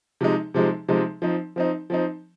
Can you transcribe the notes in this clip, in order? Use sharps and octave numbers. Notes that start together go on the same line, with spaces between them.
C3 F3 G#3 D#4
C3 F3 G#3 D#4
C3 F3 G#3 D#4
F3 C4 D#4
F3 C4 D#4
F3 C4 D#4